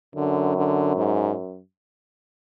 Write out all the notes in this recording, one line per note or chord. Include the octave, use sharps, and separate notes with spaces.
F#2 D3
D3
G#2